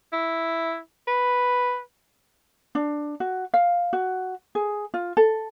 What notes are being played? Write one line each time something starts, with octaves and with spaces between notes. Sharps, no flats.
E4
B4
D4
F#4
F5
F#4
G#4
F4
A4